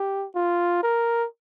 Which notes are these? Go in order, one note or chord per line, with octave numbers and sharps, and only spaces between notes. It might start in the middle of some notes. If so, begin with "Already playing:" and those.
Already playing: G4
F4
A#4